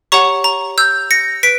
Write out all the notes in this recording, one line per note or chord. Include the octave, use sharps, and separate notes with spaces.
G4 C#5 F#5 A#5 C#6
A#5
E6 G6
A#6 C#7
B4 B6 D7